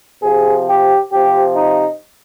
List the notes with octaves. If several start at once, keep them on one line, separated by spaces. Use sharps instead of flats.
C3 F3 G#4
G4
C3 F3 G4
D#4